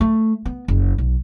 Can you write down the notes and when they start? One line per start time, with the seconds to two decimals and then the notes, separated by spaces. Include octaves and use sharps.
0.01 A3
0.45 B3
0.68 F#1
0.98 B1